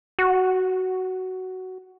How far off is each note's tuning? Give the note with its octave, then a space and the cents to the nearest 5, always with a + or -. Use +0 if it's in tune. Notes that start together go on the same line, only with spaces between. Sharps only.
F#4 +10